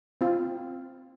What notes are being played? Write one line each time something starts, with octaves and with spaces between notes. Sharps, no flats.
C4 F4